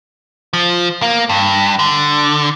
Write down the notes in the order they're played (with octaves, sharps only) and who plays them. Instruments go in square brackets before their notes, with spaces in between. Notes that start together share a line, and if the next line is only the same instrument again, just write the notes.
[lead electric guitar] F3
A#3
G2
D3